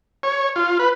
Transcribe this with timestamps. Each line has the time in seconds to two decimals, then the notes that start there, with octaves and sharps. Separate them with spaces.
0.23 C#5
0.56 F4
0.79 B4